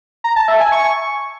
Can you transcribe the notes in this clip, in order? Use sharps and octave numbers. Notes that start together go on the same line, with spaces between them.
A#5
A5
E5
G#5
C#6